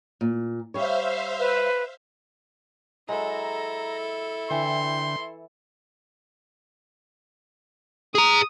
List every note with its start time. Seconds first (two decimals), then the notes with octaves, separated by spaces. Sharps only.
0.21 A#2
0.74 G3 C5 C#5 E5 F5
1.39 B4
3.09 F#3 G#3 E4 A4 A#5
4.51 D3 E3 G5 C6
8.15 G#4 A#5 D#6